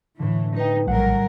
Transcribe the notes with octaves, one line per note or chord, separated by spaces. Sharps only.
A2 D3 E3
D#4 B4 G5
A#1 F#3 G3 A#4 F#5